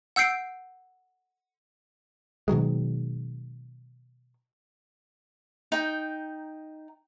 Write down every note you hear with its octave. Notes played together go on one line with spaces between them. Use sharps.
F#5 E6 G6 C7 D7
B2 D#3 F#3 G#3
D#4 G5